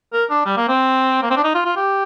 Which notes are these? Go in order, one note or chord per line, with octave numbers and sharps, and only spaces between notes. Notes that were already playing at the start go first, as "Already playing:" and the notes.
A#4
D4
G3
A#3
C4
A#3
C4
D4
D#4
F4
F4
G4